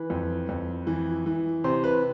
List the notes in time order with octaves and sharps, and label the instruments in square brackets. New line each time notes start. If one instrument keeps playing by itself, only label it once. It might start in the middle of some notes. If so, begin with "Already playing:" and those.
Already playing: [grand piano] E3 B4
F2
F2
E3
E3
C3 C5
B4